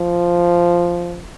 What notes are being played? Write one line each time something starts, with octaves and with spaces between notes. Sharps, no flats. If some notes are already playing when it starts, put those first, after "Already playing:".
Already playing: F3